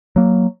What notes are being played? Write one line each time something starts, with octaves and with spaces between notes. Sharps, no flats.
F#3 A#3